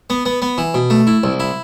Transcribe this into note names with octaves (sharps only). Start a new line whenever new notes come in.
B3
B3
B3
E3
B2
A3
E4
C2
E4